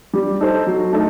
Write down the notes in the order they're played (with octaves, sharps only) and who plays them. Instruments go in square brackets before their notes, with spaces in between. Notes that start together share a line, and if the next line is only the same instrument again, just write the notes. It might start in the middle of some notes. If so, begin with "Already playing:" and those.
[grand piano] G3
D#4 A4 C5
F#3
A3 D#4 A4